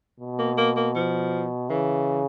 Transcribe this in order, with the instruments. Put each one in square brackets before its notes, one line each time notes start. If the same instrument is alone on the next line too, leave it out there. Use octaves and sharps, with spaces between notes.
[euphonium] B2
[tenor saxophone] A#3
A#3
A#3
F3
[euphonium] C#3 [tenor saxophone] E3